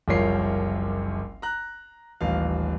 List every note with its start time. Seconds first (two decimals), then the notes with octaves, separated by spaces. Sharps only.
0.08 F#1 C2 F3 A#4 C#5 C7
1.42 A#5 F#6
2.21 D#1 A1 F5